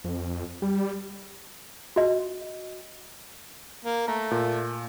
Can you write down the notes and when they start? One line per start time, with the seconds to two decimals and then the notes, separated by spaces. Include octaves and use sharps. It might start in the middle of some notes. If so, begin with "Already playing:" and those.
0.04 F2
0.62 G3
1.96 F#4 D#5
3.85 A#3
4.08 A3 A#5
4.31 A#2